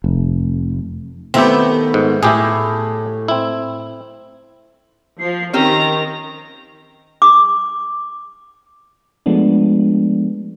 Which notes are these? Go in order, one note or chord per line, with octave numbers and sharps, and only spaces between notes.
F1
D#3 A3 B3 C4 E4 G4
G#2
A2 E4 G4 G#4
C4 E4
F3 C7
D#3 C4 C#4 G4 A#5
D6
F3 G#3 A3 B3 D4